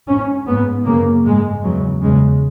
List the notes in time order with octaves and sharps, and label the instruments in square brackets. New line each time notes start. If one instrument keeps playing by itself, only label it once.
[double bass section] G#2 C#4
G#2 B3
F#2 C#3 A#3
G#2 G#3
E2 C#3 F#3
E2 C#3 G#3